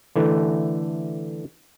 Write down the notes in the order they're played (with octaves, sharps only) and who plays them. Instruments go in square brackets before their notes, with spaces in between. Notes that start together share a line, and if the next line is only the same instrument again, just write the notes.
[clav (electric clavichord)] D3 E3 A3